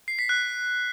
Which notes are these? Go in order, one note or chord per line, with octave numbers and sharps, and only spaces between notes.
C7
B6
F#6